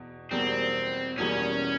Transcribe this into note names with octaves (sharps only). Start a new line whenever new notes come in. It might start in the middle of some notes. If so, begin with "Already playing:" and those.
Already playing: E2 B2
E2 B2 G3 A#3 C4
E2 B2 G3 A#3 C#4